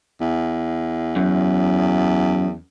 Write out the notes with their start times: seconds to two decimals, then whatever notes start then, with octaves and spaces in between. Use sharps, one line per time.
0.21 E2
1.16 F#2